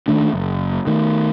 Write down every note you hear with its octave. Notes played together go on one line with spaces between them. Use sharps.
D#3 A3 D4
F#1
D#3 A3